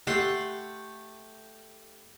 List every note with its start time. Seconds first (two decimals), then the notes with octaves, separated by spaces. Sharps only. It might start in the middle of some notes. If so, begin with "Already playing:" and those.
0.07 A3 G4 F#5 C6